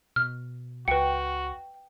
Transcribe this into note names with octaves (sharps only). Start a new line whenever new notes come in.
B2 F6
C#2 F#4 B4 G5 C#7